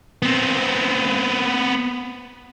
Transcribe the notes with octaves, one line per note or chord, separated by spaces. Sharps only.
B3 C4